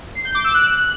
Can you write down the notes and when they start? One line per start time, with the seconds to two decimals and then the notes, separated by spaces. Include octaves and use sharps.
0.15 C7
0.25 G6
0.35 D6
0.44 E6
0.54 F#6